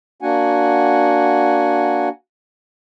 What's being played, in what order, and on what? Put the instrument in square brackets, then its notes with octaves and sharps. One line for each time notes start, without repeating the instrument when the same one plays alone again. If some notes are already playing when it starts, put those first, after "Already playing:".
[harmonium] A#3 D4 F#4 F#5 G#5